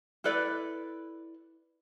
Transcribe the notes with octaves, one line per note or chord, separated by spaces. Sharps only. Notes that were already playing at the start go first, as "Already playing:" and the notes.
E4 A4 B4 D5